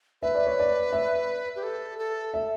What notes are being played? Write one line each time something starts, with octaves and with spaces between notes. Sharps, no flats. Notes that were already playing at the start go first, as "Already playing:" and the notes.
B4 E5
D5
C#5
D5
E5
G4
A4
A4
E5